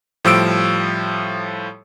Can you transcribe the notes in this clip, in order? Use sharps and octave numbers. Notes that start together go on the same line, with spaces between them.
A2 F3 G3 E6 D7